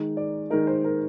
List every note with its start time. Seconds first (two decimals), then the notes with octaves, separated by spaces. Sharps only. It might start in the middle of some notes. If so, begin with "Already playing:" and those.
Already playing: D#3 G#3 D#4
0.17 D5
0.50 D#3 G#3 D#4 A#4
0.67 C5
0.84 A#4